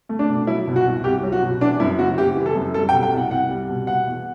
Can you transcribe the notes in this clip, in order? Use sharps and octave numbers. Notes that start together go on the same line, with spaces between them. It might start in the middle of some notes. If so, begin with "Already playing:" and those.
A3
D4
B2
F#3 E4
B2
F#4
C2
C2 G4
F#3
F#4
B2
E3 D4
F#2 E4
F#1 F#4
F#1 G4
E3
A4
F#2
G3 A4
G5
B2
G5
C2
F#5
C2 F#5
G3
B2
B2 F#5
E2